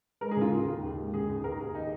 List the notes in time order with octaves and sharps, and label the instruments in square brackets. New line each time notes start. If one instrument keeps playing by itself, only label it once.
[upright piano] G#3 A#4
G#4
C#3 F4
D#2
D#2
D#2
G#3
C#3 G#4
D#2
D#2 A#4
D#2 G#4
D#3 D#4